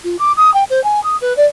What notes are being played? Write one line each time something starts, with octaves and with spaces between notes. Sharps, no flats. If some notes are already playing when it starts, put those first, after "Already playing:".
F4
D6
D#6
G5
C5
G#5
D#6
B4
D5